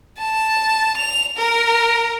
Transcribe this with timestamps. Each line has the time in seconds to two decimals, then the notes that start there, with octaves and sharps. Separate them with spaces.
0.18 A5
0.97 F7
1.37 A#4